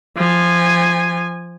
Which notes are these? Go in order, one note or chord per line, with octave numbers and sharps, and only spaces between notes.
F3 G#5